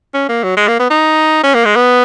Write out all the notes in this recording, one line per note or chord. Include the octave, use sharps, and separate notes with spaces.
C#4
A#3
F#3
G#3
A#3
B3
D#4
C#4
A#3
G#3
B3